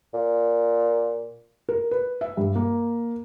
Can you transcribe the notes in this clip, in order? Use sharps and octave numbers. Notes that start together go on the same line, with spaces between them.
A#2
A#4
B4
E5
G2
A#3